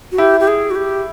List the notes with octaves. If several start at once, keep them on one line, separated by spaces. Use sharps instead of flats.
F#4
E4 G4
G4
G#4
F#4
G4